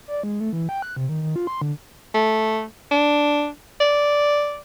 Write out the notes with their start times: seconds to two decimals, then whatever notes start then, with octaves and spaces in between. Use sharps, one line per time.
0.08 D5
0.23 G#3
0.40 A3
0.53 E3
0.69 G5
0.82 F#6
0.97 C3
1.09 D#3
1.22 D#3
1.36 F4
1.47 C6
1.62 D3
2.14 A3
2.91 D4
3.80 D5